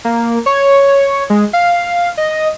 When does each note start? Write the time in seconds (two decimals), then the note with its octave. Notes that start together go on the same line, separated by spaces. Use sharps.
0.05 A#3
0.46 C#5
1.30 G#3
1.53 F5
2.17 D#5